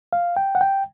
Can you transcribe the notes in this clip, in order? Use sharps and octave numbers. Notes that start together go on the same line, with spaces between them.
F5
G5
F#5
G5